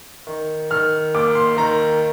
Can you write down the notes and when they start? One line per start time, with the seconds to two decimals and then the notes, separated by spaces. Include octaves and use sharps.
0.27 D#3
0.70 D#3 F6
1.14 D#2 D6
1.35 C6
1.57 D#3 A#5